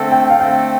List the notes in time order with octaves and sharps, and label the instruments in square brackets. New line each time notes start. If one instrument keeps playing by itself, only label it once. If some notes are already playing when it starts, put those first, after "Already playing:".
Already playing: [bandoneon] D3 A3 C4 A4
[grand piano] G5
F5
[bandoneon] D3 A3 C4 A4 [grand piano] G5